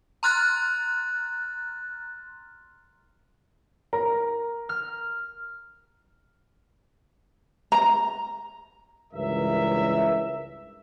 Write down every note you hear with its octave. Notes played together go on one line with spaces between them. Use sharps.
A#5 C6 F6 F#6 A6
A#4 A#5
F6
A#5
C#2 G2 E3 A#4 E5